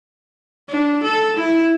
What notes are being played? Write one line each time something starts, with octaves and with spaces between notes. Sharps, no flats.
D4
A4
E4